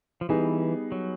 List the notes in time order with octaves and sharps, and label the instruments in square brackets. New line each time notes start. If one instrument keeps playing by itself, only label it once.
[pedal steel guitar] F3
[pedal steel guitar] E3 [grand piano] G3 B3 D#4 G#4
[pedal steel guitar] F#3